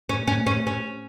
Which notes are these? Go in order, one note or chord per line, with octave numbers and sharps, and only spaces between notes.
C#4
C#4
C#4
C#4